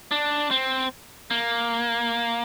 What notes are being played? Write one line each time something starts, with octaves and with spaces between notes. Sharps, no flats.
D4
C4
A#3